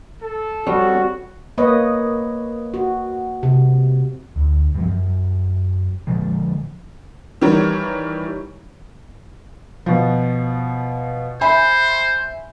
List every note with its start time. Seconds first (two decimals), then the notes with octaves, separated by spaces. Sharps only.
0.21 A4
0.67 G3 C4 F#4 C#5
1.58 A#3 B4 C#5 D#5
2.74 F#4
3.43 C3
4.36 D2
4.75 G2 F3
4.87 F#2
6.07 A#2 D3 F3 G#3
7.41 D#3 E3 G3 A#4 C#5
9.86 B2 F3
11.41 C5 E5 G#5 B5